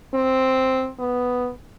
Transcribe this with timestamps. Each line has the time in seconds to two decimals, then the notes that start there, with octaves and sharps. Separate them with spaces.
0.14 C4
0.99 B3